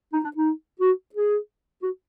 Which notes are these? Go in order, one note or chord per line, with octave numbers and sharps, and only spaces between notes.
D#4
D4
D#4
F#4
G#4
F#4